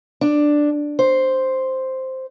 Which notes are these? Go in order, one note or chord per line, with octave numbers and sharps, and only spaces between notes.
D4
C5